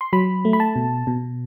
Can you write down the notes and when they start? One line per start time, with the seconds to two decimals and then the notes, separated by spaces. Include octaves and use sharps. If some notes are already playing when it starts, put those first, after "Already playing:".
0.01 C6
0.13 F#3 B5
0.45 A3
0.53 B5
0.60 A5
0.76 B2
1.07 B2